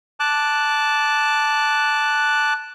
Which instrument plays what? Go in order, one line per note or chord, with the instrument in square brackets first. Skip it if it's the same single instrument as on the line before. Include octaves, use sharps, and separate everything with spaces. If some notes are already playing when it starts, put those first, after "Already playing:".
[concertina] A5 D6 F#6